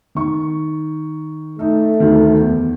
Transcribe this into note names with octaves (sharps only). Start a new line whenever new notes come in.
D#3 C#6
A3 D#4 A4
D2 D#3
E2